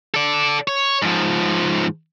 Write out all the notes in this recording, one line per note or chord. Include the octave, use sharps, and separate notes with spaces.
A4 D5
C#5
G#2 F3